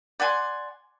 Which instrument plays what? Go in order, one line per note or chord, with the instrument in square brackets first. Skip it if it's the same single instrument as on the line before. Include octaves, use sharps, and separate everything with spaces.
[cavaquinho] D5 F#5 G#5 C6